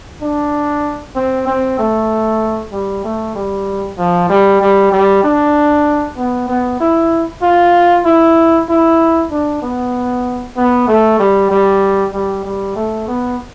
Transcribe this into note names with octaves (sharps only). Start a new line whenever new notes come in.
D4
C4
C4
A3
G3
A3
G3
F3
G3
G3
G3
D4
B3
B3
E4
F4
E4
E4
D4
B3
B3
A3
G3
G3
G3
G3
A3
B3